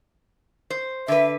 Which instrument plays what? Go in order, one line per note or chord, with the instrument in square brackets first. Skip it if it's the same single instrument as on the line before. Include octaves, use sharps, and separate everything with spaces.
[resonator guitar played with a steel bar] C5
[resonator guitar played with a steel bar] D3 B4 [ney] E5